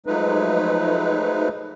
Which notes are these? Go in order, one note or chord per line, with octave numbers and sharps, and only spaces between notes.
F3 F#3 G#3 A3 D#4 B4